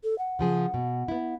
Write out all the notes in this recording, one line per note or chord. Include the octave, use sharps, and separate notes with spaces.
A4
F#5
C#3 F3 G#4
B2
B3 E4